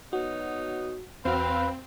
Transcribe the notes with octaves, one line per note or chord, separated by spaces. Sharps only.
B3 D#4 F#4 C#5
E2 C4 F#4 B4 F5